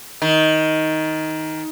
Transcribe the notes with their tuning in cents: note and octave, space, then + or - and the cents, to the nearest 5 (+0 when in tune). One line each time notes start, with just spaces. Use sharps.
D#3 +10